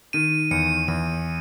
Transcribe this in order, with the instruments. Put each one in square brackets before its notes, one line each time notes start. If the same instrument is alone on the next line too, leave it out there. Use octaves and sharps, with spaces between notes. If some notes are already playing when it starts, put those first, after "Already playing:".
[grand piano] D#3 [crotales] D#7
[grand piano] E2 [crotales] C#7
[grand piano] E2 [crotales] D#7